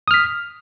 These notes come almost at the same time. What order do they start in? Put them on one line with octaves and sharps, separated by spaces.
D#6 F6 B6